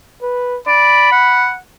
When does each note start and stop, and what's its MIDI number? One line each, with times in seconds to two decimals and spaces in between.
0.22 0.58 71
0.67 1.11 74
0.67 1.53 83
1.12 1.58 78